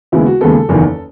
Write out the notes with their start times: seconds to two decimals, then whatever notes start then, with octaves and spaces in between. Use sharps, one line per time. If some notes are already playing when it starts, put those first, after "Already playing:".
0.12 D#2 C#3 G#3 B3 E4
0.26 F#4
0.41 D#2 C#3 G#3 B3 A4
0.69 F#1 E2 D#3